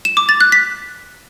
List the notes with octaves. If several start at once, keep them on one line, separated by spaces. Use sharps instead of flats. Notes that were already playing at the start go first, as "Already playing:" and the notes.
E7
D6
A6
F#6
B6